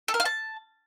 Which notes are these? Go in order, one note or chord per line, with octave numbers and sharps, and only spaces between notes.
A4
A#4
F5
A5